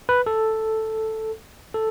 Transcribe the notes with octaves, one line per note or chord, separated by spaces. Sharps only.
B4
A4
A4